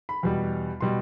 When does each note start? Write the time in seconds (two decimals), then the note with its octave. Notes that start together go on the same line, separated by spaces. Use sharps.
0.09 B5
0.23 E2 B2 G3
0.81 B2 G3 C6